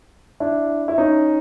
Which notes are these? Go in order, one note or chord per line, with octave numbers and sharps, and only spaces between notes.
D4 E4
E4
C#4 D#4